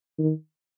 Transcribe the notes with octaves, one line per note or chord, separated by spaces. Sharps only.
D#3